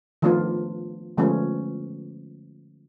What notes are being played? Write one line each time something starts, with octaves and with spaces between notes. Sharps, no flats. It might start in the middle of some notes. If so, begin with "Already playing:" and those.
D#3 F3 A3 B3 D4 F4
D3 F3 G#3 A3 B3 C#4